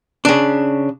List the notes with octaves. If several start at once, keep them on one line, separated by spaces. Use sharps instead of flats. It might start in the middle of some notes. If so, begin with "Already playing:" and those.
C#3 D4